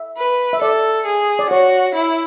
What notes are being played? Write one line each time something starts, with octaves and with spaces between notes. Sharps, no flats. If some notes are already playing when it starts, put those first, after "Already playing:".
Already playing: E5
B4
E5
A4 D5
G#4
D5
F#4 C#5
E4